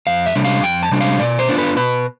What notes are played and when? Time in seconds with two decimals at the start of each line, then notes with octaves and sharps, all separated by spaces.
0.07 F2 F5
0.26 E5
0.35 C3 G3 D4
0.44 F5
0.63 F2 G5
0.83 A5
0.91 C3 G3 D4
1.01 F5
1.20 B2 D5
1.39 C5
1.48 B3 D4 F4
1.58 B4
1.76 B2 B4